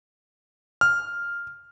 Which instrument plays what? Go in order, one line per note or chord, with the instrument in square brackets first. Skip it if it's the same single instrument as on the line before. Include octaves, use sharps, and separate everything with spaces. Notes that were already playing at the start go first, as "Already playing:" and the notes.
[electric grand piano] F6